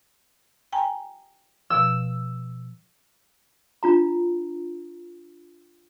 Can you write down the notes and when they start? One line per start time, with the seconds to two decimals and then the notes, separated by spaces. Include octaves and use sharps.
0.73 G5 G#5 A#5
1.70 B2 F3 E6
3.83 D4 F4 A#5